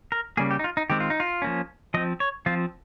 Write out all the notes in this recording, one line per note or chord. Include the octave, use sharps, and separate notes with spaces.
A#4
C#3 G3 A#3 G#4
G4
D#4
F4
D#4
D#3 G#3 C4 G4
F4
D#4
F4
F3 A#3 C#4
F3 C4 D#5
C#5
F3 C4 F4